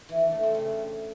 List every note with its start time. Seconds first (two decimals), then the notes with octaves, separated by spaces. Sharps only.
0.09 E3
0.20 D4
0.32 A3
0.43 C4
0.55 C#3